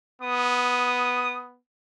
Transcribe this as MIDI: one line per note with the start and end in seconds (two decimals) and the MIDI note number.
0.22 1.58 59
0.22 1.40 87